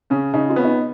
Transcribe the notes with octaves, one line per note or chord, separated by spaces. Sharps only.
C#3 C#4
C#3 D#4
F4
B3 C#4
D#4